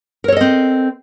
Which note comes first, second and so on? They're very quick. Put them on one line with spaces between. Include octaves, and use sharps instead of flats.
A#4 C#5 A4 D#5 C4